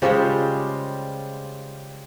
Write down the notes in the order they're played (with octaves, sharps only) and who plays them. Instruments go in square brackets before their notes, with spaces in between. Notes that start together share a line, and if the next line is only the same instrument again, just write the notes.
[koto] C#3 G3 G#3 [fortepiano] F4 G4 C5